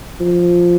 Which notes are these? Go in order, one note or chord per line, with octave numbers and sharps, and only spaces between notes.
F3